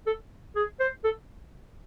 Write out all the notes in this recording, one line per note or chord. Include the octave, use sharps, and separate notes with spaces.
A4
G#4
C5
A4